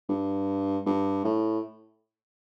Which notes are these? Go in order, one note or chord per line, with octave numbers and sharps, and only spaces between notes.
G2
G2
A2